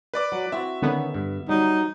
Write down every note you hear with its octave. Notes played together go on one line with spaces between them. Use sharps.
B4 D5 D6
F#3
C4 E4 F#4 E5
D3 D#3 B3 C#4
G2
F#3 G3 D#4